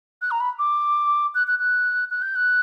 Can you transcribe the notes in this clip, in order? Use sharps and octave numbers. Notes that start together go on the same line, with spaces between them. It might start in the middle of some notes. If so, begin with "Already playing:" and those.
F#6
A#5
B5
D6
F#6
F#6
F#6
F#6
G6
F#6